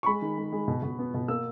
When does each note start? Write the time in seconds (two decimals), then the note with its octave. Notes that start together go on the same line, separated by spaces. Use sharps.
0.03 C#6
0.06 G#3 B5
0.22 D#3
0.38 G#3
0.52 G#3
0.68 B2
0.83 B2
0.99 B3
1.14 B2
1.28 A#3 E6